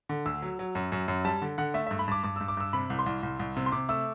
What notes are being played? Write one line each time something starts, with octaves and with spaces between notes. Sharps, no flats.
D3
D2 E6
F#3
F#3
F#2
F#2
F#2
G3 A5
D3
D3 F#5
A3 E5
G2 E5
B5
G2 D6
G2 D6
G2 E6
D6
G2 E6
C3 B5
C2
C6
C2
C2
C2
C3
C6
C3 D6
A3 E6